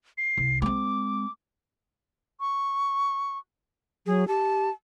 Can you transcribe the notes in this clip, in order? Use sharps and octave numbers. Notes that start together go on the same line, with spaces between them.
C7
C2
G#3 C4 D6
C#6
F#3 G#4
G4 A5